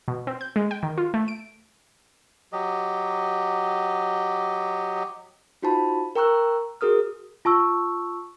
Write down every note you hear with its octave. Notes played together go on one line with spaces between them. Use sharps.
B2
C4
G6
G#3
G5
D#3
F4
A3
D7
F#3 G4 D#5
D#4 F4 F#4 C5 A5 B5
A#4 G5 A#5 C#6 E6 F#6
F#4 G#4 A#4 D#6 F6
F4 A5 C#6 E6